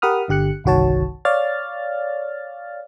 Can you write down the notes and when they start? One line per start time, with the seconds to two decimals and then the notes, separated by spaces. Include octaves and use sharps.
0.02 G4 A#4 F#5 B5 D#6 F6
0.28 G1 D3 G4 F#6 C#7
0.64 G1 C2 D#3 F#4 C#5 A5
1.25 C#5 D5 F5 F6 A6